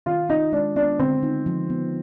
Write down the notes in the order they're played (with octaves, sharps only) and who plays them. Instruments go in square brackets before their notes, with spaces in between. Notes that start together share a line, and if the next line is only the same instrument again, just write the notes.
[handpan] D#3 [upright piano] F4
[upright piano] D#4 [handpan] F4
[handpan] G#3 [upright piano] D4
[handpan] B3 [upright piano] D4
[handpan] D3 [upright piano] C4
[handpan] D#4
F3
B3